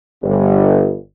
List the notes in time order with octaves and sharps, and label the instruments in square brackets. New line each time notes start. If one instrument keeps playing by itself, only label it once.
[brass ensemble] G1